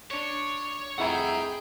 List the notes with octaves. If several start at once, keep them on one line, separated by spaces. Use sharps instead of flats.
D4 C#5
F1 E4 G#4 F#5 G5 A#5 B5